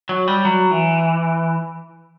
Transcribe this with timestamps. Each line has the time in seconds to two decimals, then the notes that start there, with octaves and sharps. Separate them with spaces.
0.09 F#3
0.28 G3
0.45 F#3
0.71 E3